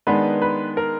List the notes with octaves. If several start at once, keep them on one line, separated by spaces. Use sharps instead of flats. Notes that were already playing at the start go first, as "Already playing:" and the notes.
D#3 G#3 B3 D4 B4
B4
A#4